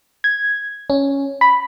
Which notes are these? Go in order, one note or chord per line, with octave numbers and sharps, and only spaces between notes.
G#6
C#4
B5